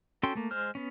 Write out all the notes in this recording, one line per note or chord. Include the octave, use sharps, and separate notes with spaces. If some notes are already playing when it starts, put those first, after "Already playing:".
C#4 F#4 A4 G5 C6
A3 A#3
G#3 C5 F6
B3 C#4